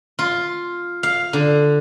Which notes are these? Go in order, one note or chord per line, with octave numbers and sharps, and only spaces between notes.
F4
F5
D3